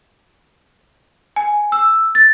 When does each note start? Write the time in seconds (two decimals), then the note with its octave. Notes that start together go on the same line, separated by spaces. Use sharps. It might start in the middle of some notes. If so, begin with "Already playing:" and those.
1.36 G#5
1.72 E6
2.15 A6